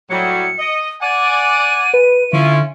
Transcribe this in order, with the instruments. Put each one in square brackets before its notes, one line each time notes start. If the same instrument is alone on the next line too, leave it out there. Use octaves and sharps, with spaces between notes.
[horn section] A2 F#3 G3 [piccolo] C#7
[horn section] D#5
[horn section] D5 F#5 G#5 [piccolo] D#7
[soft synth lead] B4
[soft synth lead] D3 [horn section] C#4 E4 F4